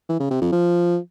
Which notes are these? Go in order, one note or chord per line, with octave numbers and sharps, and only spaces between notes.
E3
C#3
C3
F2
F3